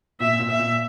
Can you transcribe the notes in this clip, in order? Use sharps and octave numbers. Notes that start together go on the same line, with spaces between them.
A#2 E5
A#2
E5
A#2